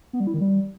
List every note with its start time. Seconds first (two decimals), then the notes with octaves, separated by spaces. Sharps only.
0.13 B3
0.20 G3
0.27 E4
0.34 D#3
0.41 G3